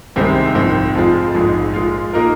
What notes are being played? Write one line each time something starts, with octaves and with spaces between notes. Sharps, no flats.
C2 C3 D#3 G#3 C4
A#1 G#2 F3 C4
F2 F3 G#3 F4
A#1 G#2 G#3
A#2 G#3 F4
A#2 A#3 D#4 A#4